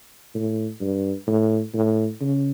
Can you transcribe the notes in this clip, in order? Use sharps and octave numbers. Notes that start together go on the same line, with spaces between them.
A2
G2
A2
A2
C#3